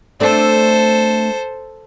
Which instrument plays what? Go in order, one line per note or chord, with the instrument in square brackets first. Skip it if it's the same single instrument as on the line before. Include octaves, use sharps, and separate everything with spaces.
[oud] A3 C4 D4 [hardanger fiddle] A4 C5